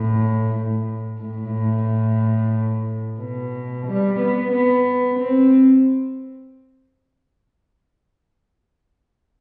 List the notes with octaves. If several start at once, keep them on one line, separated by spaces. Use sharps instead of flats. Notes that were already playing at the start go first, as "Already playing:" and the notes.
Already playing: A2
A2
B2
G3
B3
B3
C4